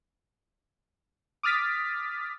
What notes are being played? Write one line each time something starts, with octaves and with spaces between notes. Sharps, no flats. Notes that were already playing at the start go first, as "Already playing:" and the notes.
D6 D#6 F6 A6 B6